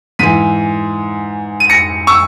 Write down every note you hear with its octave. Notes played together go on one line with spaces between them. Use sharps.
G#2 E3 B6 D#7
D#7
A#6 C#7
C#6 E6